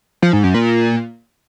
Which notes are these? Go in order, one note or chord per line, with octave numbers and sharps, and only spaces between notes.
F3
G#2
F#2
A#2